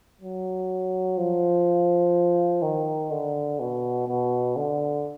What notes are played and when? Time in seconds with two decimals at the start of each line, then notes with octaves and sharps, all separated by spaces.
0.21 F#3
1.17 F3
2.62 D#3
3.11 D3
3.60 B2
4.08 B2
4.56 D3